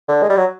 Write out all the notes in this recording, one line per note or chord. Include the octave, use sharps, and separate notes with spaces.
D3
G#3
G3
F#3